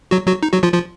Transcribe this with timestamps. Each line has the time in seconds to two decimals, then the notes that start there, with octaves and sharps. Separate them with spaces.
0.11 F#3 F#4
0.27 F#3 F#4
0.43 D#4
0.53 F#3 F#4
0.63 F3 F4
0.74 F3 F4